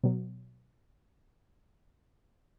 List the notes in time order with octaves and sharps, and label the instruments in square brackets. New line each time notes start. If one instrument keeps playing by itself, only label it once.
[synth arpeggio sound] B2 F#3